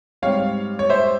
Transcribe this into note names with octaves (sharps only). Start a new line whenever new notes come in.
G#2 G3 C4 C#5 F5
C#5
C5 E5